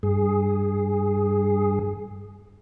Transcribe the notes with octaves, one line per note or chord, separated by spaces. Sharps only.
G2 G#4